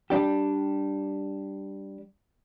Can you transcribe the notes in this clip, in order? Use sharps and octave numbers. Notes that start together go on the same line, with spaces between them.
G3 D4 G4